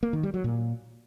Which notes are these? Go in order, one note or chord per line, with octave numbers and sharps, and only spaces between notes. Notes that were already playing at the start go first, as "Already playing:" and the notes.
A#3
D#3
G3
F#3
A#2